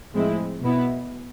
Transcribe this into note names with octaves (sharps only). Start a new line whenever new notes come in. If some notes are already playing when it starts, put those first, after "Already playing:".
A2 F3 G#3 C4 E4
B2 B3 E4